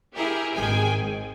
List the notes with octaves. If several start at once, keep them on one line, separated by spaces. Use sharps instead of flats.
E4 G4 G#4 A#4
G#1 D#3 G#4 G5 G#5
G#2